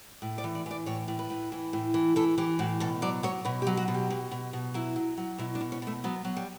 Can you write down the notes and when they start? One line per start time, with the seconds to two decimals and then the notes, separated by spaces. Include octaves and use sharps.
0.22 A2
0.38 D5
0.44 E3
0.55 D5
0.66 E3 D5
0.86 A2 C#5
1.08 A2
1.19 B4
1.30 A2
1.52 E3
1.73 A2
1.94 E3
2.16 E3 A4
2.38 E3 G4
2.59 A2 F#4
2.80 B2 A4
3.02 F#3 D5
3.23 F#3 C#5
3.45 B2 B4
3.62 G4
3.67 F#3
3.77 F#4
3.88 B2
3.94 G4
4.10 B2
4.31 B2
4.53 B2
4.74 F#3 E4
4.96 F#3
5.18 F#3
5.38 B2 E4
5.55 D4
5.61 B2
5.72 C#4
5.82 B2 A3
6.04 F#3 B3
6.25 F#3
6.37 G3